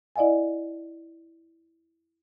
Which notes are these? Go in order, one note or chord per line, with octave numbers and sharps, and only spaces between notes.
E4 D5 D#5 F5 G#5